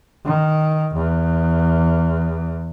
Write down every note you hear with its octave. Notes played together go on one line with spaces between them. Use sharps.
D#3
E2